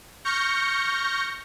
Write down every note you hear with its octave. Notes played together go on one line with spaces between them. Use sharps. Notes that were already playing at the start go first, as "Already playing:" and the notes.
C#6 F6 G6 A#6 C#7